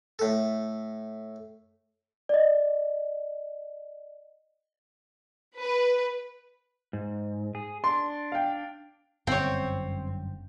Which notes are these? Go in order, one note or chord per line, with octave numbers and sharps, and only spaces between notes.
A2 A4
D5 D#5
B4
G#2
G#4
D4 C6
F5 G5
G1 F#2 C4 C#5 G5